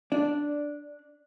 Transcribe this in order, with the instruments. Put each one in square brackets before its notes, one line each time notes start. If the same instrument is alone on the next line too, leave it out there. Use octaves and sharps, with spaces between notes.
[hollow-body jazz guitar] D4 D5